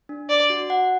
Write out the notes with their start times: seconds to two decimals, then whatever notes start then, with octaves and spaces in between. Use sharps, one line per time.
0.09 D4
0.29 D4 D5
0.50 F#4
0.70 F#5